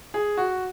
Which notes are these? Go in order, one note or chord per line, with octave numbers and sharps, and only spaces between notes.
G#4
F#4